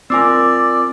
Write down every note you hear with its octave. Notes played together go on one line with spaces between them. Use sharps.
C4 F4 A#4 D5 G#5 D6 E6